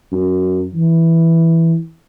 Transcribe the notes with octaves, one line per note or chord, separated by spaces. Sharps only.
F#2
E3